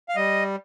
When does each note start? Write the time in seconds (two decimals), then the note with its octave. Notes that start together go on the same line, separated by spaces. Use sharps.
0.09 F5
0.16 G3 D#5